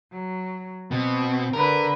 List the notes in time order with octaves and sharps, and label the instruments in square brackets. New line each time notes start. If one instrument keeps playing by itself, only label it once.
[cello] F#3
[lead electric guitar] B2 [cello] C4
[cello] D3 B4 [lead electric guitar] A#4